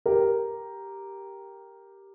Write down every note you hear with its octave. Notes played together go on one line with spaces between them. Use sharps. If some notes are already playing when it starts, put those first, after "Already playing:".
G4 A#4